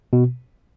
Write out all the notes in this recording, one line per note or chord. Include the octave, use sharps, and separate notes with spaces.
B2